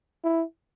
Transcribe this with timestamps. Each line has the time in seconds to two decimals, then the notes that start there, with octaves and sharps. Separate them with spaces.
0.24 E4